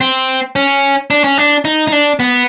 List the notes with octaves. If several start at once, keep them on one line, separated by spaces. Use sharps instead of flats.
C4
C#4
D4
C#4
D4
D#4
D#4
D4
B3